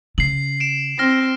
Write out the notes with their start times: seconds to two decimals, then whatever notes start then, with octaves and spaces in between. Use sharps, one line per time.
0.18 C#3 C7 F#7
0.60 D7 E7
0.99 C4 F6 A#6